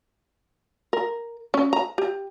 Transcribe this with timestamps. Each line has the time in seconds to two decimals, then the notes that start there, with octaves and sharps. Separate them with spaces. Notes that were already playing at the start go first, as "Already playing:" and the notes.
0.93 A#4
1.54 C#4
1.73 A#5
1.98 G4